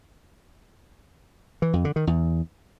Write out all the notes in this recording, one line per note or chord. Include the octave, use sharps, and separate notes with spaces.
E3
F2
D3
D#3
E2